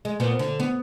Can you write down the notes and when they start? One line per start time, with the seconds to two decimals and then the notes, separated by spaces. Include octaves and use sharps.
0.05 G#3
0.20 A#2 B3 C4
0.39 D3
0.60 B3